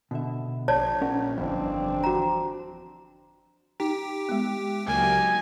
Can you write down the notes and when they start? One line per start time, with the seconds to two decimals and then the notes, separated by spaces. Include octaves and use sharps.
0.11 B2 D3 E5
0.68 A#1 C#5 D5 A5
1.01 C#4 A#4 F#5
1.38 G1 F2 E3 C4 D4
2.04 F#4 A#5
3.80 D#4 G4
4.29 G#3 B3
4.87 C#2 F#3 A#3 D#4 G4 G#5